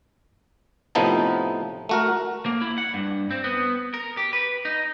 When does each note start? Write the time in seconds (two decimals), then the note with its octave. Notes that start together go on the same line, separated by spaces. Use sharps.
0.95 A2 C3 F3 B3 D#4 A5
1.89 A3 F#4 A#4
2.46 A#3
2.61 E4
2.78 F#5
2.94 G2
3.31 C4
3.44 B3
3.94 A#4
4.17 G4
4.33 B4
4.65 D#4